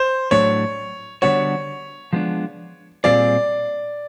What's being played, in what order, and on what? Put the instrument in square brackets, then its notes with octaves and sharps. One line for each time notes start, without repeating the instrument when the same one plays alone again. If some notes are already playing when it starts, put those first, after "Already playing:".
Already playing: [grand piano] C5
[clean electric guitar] A2 F#3 A3 D4 [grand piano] C#5
[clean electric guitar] D3 G3 B3 D4 F#4 [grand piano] C#5
[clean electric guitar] F3 G#3 B3 D4
[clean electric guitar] A#2 G3 C4 F4 G#4 [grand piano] D5